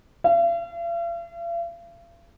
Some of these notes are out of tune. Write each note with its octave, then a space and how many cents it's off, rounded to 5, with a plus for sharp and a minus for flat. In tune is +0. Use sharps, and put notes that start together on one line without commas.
F5 -45